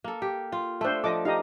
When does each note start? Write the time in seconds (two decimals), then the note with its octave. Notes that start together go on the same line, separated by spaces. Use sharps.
0.04 A#3 A4
0.22 G4
0.52 F4
0.81 A3 D4 A4 C5
1.04 F3 A4 D#5 D6
1.25 D#4 G4 D#5 F5